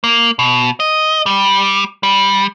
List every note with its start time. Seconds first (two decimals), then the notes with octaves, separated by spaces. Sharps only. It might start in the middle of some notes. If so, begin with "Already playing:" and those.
0.04 A#3
0.39 B2
0.80 D#5
1.26 G3
2.03 G3